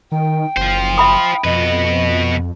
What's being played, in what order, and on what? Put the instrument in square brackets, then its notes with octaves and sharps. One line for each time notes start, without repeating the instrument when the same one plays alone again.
[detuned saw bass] D#3 [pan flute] G5
[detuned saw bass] F#1 [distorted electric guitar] F4 C5
[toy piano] E5 B5 D#6
[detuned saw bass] F2 [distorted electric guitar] B2 B4 [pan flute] D#5